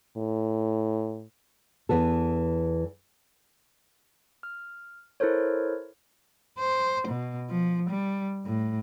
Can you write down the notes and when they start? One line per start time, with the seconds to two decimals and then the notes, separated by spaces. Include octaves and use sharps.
0.17 A2
1.89 E2 E3 B3 A4
4.43 F6
5.20 E4 A4 A#4 C5 C#5
6.59 C5
7.08 B2
7.50 F3
7.90 G3
8.45 A2